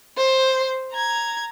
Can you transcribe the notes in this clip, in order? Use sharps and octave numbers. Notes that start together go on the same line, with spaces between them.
C5
A#5 G#6